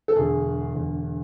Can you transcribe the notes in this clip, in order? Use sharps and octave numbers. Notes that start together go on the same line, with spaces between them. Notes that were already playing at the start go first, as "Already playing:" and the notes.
A4
E1 E2 D3 G#4
E1 E2 D3